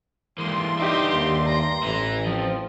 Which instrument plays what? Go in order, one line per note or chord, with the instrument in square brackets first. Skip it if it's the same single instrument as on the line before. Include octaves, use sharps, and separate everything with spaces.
[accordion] G2 C6 [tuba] E3 [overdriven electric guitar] G#3 A#3
[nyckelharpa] D#4 G4 [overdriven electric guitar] D5 E5
[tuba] D#2
[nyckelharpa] A#5
[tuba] A1 [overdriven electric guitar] E4 B4
[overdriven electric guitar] F3 [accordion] C4